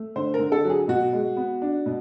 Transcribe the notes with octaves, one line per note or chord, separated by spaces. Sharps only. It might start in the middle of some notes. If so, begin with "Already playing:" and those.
Already playing: A3
D3 C5
A#4
D3
A4
F#3
G#4
B2 F#4
G#3
B3
D4
B2